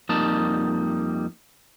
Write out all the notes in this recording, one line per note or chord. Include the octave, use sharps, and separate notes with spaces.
F2 G3 A#3 D#4 A5